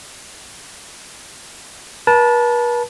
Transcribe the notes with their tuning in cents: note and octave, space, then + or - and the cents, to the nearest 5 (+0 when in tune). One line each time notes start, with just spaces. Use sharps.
B4 -45 A5 -10